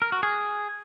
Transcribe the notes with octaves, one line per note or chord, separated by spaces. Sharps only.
A#4
F#4
G#4